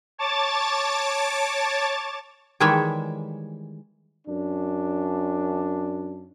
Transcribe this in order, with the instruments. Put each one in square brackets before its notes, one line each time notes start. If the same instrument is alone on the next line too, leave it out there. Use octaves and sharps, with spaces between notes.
[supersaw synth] C#5 A5 D6 A6
[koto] D#3 E3 G3 G#3 C#5 E5
[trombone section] F#2 D4